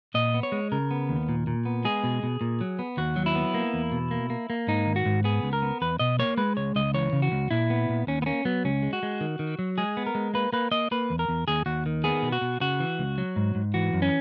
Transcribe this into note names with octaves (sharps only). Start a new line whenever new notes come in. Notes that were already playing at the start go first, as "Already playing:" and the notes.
A#2 D#5
B3
C#5
G#3
C#3 A#4
B3
D#2
A#2
A#2
B3
G#3 G#4
B2
B2
A#2
F#3
B3
D#2 F#4
F#3
E4
B3
A#3
E2
B2
A#3
A#3
A#3
G#2 D#4
D#3
F#4
G#2
B3 G#4
C#2
A#4
B3
E2 B4
B2 D#5
A#3 C#5
G#3 B4
C#2 C#5
C#2 D#5
E3 C#5
C#3
F#4
C#2
A#2 E4
B3
A#2
D#2 C#4
B3
A#3 C#4
F#3 B3
C#2 C#4
G#3
F#4
G#3
D#3
D#3
F#3
G#3 G#4
B3
A#4
G#3
A#3 B4
A#3 B4
A#3 D#5
A#3 B4
E2
A#4
E2
D#2 G#4
D#2 F#4
D#3
B3 G#4
B2
F#4
B2
C#3 F#4
E3
C#2
F#3
G#2
G#2
E3 F#4
F#2
C#4